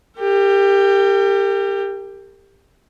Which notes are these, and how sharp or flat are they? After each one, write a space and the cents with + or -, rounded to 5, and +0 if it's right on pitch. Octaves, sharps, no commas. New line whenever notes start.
G4 +15 A#4 -40